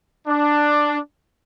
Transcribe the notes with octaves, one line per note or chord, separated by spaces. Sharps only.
D4